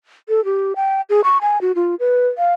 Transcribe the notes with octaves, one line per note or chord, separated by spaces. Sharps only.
A4
G4
G5
G#4
C#6
G#5
F#4
F4
B4
F5